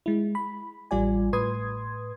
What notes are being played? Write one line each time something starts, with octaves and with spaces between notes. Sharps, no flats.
G#3 E4
B5
A1 G3 F4 D5 G#5
A2 B4 C6 D#6 G#6